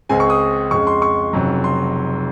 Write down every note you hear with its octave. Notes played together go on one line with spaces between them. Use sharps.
C#2 C#3 G#3 C4 G#5
C#6
D#6
F2 C#3 G#3 C#6
C6
C#6
F1 F2 C#3 F#3
C6